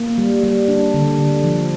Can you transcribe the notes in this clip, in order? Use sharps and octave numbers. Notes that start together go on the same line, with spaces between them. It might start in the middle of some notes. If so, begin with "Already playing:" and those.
Already playing: A#3
G3
G3
D4
D3
D3
F3